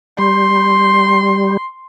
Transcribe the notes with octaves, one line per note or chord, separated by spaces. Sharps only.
G3 C6